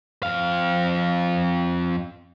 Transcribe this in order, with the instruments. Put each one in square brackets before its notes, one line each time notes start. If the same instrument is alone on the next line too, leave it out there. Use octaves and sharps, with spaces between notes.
[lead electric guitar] F2 F5